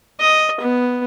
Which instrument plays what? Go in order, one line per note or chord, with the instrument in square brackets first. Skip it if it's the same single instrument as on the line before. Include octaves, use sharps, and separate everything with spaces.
[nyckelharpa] D#5
B3